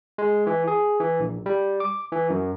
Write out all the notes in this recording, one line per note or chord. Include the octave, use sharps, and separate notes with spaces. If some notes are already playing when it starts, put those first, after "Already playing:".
G#3
E3
G#4
E3
A#1
G3
D6
E3
F#2